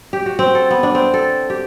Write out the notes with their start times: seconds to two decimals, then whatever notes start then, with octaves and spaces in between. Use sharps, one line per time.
0.13 G4
0.26 F#4
0.39 C4
0.55 A4
0.70 B3
0.83 D4
0.95 C4
1.14 A4
1.50 G4